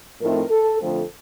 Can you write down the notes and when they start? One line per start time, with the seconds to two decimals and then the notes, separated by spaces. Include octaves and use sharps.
0.20 A2 F3 A3 C4 D#4 A#4
0.50 A4
0.80 F2 D3 F3 A3 C4 A4